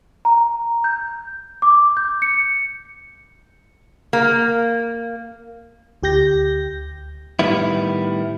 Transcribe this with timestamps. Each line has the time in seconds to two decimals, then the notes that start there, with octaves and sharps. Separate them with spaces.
0.25 A#5
0.84 G6
1.62 D6
1.97 G6
2.22 C#7
4.13 A#3
6.03 D2 G4 G6 A#6
7.39 A2 D#3 G3 B3 E4